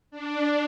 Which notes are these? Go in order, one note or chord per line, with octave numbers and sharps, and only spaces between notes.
D4